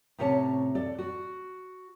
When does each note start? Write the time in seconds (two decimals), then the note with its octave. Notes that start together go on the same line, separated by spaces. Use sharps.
0.18 A2 C3 C#4 C#5 G5 A5
0.75 A4 D5
0.98 F#4